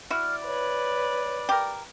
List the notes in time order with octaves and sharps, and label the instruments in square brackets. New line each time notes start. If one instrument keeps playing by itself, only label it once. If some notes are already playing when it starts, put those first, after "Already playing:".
[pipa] E4 F#4 [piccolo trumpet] D5 [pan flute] F6
[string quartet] B4 [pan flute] C#5
[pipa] G4 A#4